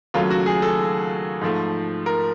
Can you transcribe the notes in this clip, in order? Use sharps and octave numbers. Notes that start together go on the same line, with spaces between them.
D#2 C#3 F#3 A3 F4
F#4
G#4
A4
G#2 F3 A3
A#4